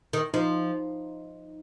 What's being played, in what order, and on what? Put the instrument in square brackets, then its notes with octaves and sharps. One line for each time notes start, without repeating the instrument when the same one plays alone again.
[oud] D#3
[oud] F3 [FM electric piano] D#4